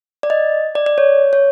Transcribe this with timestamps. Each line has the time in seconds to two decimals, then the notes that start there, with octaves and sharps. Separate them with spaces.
0.23 D5
0.30 D#5
0.75 D5
0.86 D5
0.98 C#5
1.33 C#5